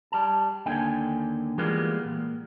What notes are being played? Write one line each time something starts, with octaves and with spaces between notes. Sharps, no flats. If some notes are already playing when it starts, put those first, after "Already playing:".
G3 A5
D#2 D3 G5 G#5
E3 G3 G#3 A#3 B3 F4
A#2